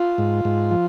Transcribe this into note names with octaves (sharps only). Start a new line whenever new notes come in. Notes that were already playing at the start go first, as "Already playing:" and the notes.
Already playing: F4
G#2
G#2
F3